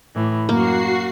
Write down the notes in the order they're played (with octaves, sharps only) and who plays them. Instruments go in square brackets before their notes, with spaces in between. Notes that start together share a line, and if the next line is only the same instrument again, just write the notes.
[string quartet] A2 E3
[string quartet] F#2 [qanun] A#3 [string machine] F#4 C7